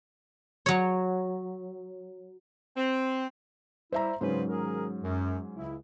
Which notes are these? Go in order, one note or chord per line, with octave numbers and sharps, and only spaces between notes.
F#3 C#5
C4
G3 E4 C5 E5 A#5
G#2 C#3 F#3 C#4 B4 C5
D#3 G#4 A#4
F#2
C#2 C#3 E4